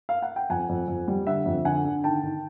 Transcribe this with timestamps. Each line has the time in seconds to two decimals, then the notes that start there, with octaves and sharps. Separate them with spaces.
0.09 F5
0.22 F#5
0.36 G5
0.50 F2 F#5 G#5
0.69 F2
0.88 F2
1.08 G3
1.26 D3 E5 F#5
1.46 F2
1.65 D3 F#5 G#5
1.85 D3
2.04 D#3 G5 A5
2.23 D#3